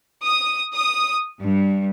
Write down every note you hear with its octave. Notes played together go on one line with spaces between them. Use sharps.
D#6
D#6
G2